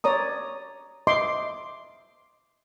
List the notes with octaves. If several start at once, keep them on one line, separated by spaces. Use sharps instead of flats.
C#5 D5 A#5 D#6
D#5 E5 C6 D6